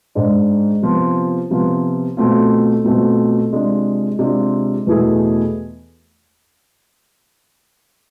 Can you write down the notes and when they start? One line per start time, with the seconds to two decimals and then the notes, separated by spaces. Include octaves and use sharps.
0.15 G#2 G#3 D4
0.82 C3 F3 B3 F4
1.51 C3 F3 B3 F4
2.17 B2 A3 C4 F4
2.85 B2 A3 C4 F4
3.53 C3 G#3 D4 F4
4.19 C3 G#3 D4 F4
4.87 E2 B2 A3 E4 G#4